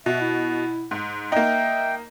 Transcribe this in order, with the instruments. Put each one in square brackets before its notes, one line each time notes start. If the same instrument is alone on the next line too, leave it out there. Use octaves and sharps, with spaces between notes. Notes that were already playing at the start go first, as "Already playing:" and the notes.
[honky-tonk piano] B2 [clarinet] E5
[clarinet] E4
[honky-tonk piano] G#2
[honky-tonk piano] A#3 D#4 [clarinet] E5 [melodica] G5